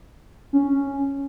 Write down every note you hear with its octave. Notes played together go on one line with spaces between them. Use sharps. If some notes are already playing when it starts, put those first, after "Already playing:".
C#4